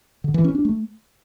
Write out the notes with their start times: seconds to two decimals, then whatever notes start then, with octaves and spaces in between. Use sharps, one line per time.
0.24 D3
0.34 E3
0.44 C#4
0.55 D4
0.65 A3